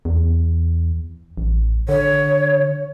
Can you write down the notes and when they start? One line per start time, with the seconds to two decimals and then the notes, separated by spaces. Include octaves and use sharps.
0.05 E2
1.37 A1
1.89 D3 C#5